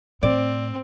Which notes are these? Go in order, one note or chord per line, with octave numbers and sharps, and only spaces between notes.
A2 C4 D5